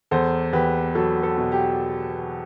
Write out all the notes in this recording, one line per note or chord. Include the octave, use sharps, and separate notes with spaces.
E2 A4 C5
E2 G4 B4
F#3 A4
A4
B2
G4